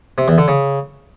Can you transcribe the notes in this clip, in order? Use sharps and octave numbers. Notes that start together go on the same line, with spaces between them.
C3
E2
D3
C#3